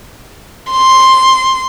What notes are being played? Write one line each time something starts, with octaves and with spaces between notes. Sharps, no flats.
C6